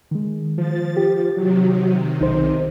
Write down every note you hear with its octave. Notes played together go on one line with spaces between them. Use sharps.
D#3 G#3
F3 A6
G4
C3 D#3 F#3
B1 D#4 C5